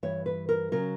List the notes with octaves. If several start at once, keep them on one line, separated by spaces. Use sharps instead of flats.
G2 E3 C#5
B4
A#4
C#3 F#3 A#4